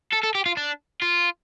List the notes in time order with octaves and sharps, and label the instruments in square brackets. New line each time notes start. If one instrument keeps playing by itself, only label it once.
[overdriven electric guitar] A4
A4
G4
F4
D4
F4